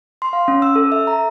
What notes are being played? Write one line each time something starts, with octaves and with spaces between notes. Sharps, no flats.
C6
F5
C#4
E6
A4
E5
A#5